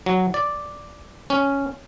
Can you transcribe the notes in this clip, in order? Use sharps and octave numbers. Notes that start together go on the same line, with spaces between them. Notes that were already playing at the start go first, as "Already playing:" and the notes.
F#3
D5
C#4